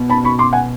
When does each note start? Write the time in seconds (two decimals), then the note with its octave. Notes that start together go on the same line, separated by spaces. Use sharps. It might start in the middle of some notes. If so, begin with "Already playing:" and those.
Already playing: B2
0.09 A5 B5
0.24 B5 C#6
0.39 C6 D6
0.53 F#5 G#5